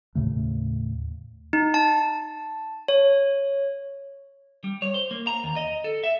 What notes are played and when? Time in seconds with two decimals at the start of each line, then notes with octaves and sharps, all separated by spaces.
0.15 D#2 A2 C#3 A3
1.53 D#4
1.74 A5
2.88 C#5
4.64 G3
4.82 C#5
4.94 C5
5.11 A#3
5.27 A#5
5.44 D#2
5.56 D#5
5.84 A4
6.04 E5